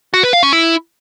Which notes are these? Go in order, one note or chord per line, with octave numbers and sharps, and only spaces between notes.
F#4
B4
F5
C#4
E4